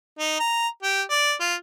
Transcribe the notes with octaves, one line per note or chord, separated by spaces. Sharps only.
D#4
A#5
G4
D5
F4